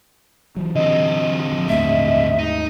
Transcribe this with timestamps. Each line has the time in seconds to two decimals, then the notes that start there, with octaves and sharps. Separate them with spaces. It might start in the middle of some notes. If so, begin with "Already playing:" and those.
0.57 E3 F#3
0.76 D3 C4 D#5
1.53 F3
1.69 D#2 G#2 A3 E5
2.39 D#4